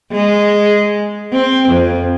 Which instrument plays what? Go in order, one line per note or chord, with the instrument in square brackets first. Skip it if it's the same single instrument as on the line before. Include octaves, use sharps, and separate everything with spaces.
[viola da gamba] G#3
C4
F2